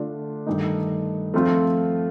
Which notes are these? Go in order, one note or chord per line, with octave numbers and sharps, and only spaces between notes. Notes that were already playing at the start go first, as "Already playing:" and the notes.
Already playing: D3 A3 D4 F4
G2 D#3 A3 D#4
F3 A3 C4 F4